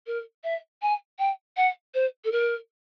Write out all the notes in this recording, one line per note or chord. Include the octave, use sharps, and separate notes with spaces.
A#4
E5
G#5
G5
F#5
C5
A4
A#4